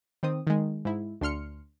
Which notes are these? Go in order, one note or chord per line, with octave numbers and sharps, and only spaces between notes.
D#3 C4 D#6
D#3 G#3
G#2 E4
D2 D4 C6 F6 C#7